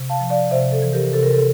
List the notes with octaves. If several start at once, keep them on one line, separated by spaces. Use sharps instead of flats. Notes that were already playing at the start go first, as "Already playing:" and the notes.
Already playing: C3
F5 A5
F3
D5 F5
C3 C5 E5
A4
E3
G4 A#4
C3 A4
A#4
A4